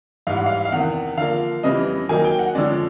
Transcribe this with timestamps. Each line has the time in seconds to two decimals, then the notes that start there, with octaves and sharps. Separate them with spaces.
0.27 G#2 E3 G3 F5
0.37 F#5
0.46 F5
0.65 F5
0.72 E2 C3 D#3 F#5
1.17 D3 F3 A#3 F5
1.63 F2 C#3 E3 G3 B3 D#5
2.09 D#3 F#3 A#3 D#4 G#5
2.24 G5
2.39 F#5
2.54 F2 D3 F3 G#3 C#4 D5